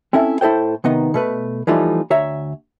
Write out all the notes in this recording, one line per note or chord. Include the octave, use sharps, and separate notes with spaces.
C4 C#4 E4 A4 E5
A2 E4 A4 C5 G5
C3 D#3 B3 D#4
B2 A3 B4
E3 F3 G3 A3 D#4 F4
D2 C#5 E5 A#5